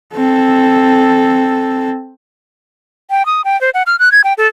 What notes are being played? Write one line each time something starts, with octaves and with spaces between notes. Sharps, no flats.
C4 A4
G5
D#6
G5
C5
F#5
F6
F#6
G#6
G5
A4